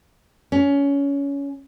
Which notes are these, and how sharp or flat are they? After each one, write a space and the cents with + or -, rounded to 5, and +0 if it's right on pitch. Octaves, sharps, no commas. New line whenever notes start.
C#4 +20